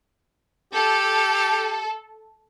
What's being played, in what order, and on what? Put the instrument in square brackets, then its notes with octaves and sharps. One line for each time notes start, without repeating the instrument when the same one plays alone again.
[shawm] G4 [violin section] A4